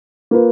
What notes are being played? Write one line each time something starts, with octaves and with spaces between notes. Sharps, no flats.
A#3 F4 B4